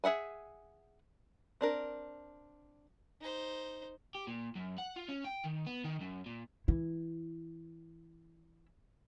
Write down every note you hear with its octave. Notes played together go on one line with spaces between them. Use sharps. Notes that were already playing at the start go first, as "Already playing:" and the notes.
G#4 E5 F#5 G#5
C4 D4 A#4
D#4 C5
G4
A#2
F#2
F#5
F4
C#4
G5
D#3
B3
D#3
F#2
A#2
E3 E4